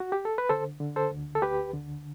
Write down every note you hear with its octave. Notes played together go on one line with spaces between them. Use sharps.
F#4
G4
A4
B4
D3 A4 C5
D3
A4 C5
D2
A4
D2 G4 B4
D3